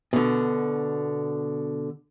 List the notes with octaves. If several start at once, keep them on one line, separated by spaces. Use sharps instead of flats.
B2 D3